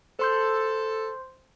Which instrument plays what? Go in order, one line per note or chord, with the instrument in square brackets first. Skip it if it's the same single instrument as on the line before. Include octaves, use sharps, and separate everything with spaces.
[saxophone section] A4 [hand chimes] C5 C6 G6